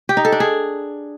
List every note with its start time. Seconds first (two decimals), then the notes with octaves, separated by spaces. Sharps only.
0.09 G4
0.17 D#4
0.25 A4
0.32 D4
0.40 G#4